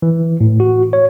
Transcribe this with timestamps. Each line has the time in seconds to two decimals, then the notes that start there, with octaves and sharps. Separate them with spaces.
0.02 E3
0.41 A2
0.60 F#4
0.93 C#5